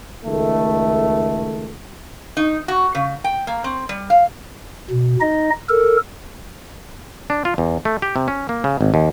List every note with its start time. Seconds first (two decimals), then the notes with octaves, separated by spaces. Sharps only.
0.24 C#2 D#3 A3
2.37 D#4
2.68 F#4
2.95 C#3
3.24 G5
3.47 A#3
3.64 C4
3.89 G3
4.10 F5
4.90 B2
5.21 D#4 D#5
5.69 A4 A#4
7.30 D4
7.45 F4
7.58 E2
7.85 A3
8.02 G4
8.16 C3
8.28 C#4
8.49 A#3
8.64 C#3
8.81 G#1
8.94 D#2